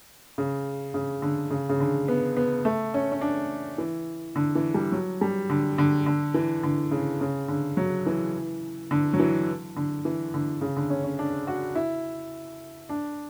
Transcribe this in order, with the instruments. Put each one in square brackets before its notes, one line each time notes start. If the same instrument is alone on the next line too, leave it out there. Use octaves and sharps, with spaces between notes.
[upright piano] C#3
C#3
D3
C#3
C#3
D3
B3
B3
A3
C#4
C#4
D4
E3
D3
E3
G3
F#3
G3
D3
D3
D3
E3
D3
C#3
C#3
D3
F#3
E3
D3
F#3
E3
D3
E3
D3
C#3
D3
C#4
C#4
D4
F#4
E4
D4